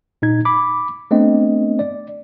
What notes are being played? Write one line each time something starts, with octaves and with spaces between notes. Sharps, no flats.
A#2 D#4 G#6
B5 D6
A3 B3 C4 D4 D#5
D5